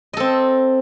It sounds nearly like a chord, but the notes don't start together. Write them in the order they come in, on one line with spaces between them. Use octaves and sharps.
D#5 A4 C4